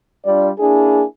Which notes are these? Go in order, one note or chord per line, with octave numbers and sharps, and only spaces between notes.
G3 D4 F4 D5
A#3 D4 E4 G#4